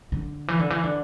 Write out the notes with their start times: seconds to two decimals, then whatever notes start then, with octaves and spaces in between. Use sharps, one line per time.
0.12 D3
0.48 E3
0.59 D3
0.70 E3
0.84 D3